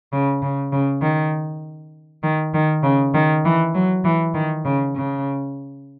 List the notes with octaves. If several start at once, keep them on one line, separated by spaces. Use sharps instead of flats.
C#3
C#3
C#3
D#3
D#3
D#3
C#3
D#3
E3
F#3
E3
D#3
C#3
C#3